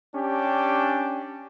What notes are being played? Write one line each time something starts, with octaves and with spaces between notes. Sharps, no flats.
C#4 D4 G4